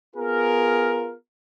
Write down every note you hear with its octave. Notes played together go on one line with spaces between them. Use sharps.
B3 F4 G#4 A#4